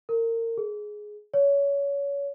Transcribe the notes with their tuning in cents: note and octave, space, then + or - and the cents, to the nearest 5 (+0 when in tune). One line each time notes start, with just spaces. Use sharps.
A#4 -30
G#4 +10
C#5 +25